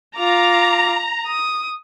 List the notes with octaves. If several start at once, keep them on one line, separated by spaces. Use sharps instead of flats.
F4 A#5 D6
D#6